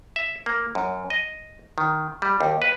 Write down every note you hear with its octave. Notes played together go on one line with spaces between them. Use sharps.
E5
A#3
F#2
D#5
D#3
G3
D#2
B4